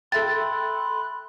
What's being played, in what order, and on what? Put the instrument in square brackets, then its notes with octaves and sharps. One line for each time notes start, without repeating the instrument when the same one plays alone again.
[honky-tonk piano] A4 E5 G5 [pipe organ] B5 C6 F#6 [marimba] A6